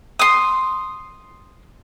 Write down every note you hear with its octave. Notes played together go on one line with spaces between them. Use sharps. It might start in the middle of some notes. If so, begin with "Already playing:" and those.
C6 D#6